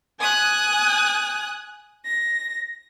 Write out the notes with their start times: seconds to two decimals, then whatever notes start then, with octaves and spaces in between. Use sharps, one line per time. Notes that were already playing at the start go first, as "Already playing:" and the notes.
0.19 G#5 D#6 F#6
2.05 A#6